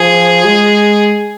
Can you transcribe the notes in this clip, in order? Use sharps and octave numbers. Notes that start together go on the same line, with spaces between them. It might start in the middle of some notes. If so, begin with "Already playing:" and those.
Already playing: F3 G#4
G#3